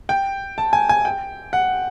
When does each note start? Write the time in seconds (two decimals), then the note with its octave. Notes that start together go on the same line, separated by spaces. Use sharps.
0.09 G5
0.58 A5
0.73 G#5
0.89 G#5
1.05 G5
1.53 F#5